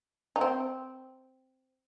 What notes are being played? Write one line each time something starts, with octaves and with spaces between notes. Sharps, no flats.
D#4
C4